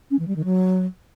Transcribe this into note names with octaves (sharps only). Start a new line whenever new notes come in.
C#4
E3
G3
D#3
F#3